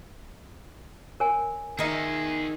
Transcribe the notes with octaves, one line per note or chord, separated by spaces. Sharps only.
A#4 C#5 G#5
D#3 D#4 G#4 E5